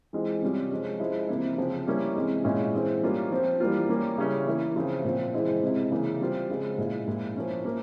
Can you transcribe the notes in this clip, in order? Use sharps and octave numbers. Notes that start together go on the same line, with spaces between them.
E3 G#3 C4 F4
C3 G3 C#4 F4
F3 G#3 C#4
F3 G#3 E4
C3 E3 A#3 E4
C#3 F3 C4
G3 A#3 C#4 E4
C3 E3 G#3
A#2 G#3 C#4 E4
E3 G#3 C4
G3 A#3 C#4 F4
F3 C4 F4
E3 G3 A#3 F4
G3 A#3 C#4
C#3 G3 C#4 E4
E3 A#3 E4
C#3 F3 C4 F4
A#2 F3 C4
C#3 E3 G#3 C4 E4
C3 E3 G#3 E4
C#3 E3 A#3
G3 C4 F4
C#3 F3 G#3 C4
A#2 G#3 E4
A#2 F3 G#3 E4
F3 A#3 C#4 E4
F3 A#3